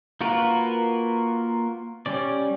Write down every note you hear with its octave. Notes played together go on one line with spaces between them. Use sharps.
A#3 F4 F#4 A#4 B4
G3 C#4 D5